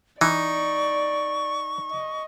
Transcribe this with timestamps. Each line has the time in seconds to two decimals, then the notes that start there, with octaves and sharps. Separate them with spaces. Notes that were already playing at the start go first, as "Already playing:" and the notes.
0.21 E3 D#4 D5 C#6
1.91 D#5